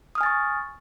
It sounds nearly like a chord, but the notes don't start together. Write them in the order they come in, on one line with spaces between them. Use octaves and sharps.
D#6 F6 G#5 A6 C#6